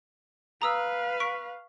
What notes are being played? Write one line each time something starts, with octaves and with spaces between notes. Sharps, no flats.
B4 F5 A#5 D#6 E6
C#6 B6 D7